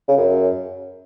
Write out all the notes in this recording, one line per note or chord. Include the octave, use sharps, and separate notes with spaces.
C#3
F#2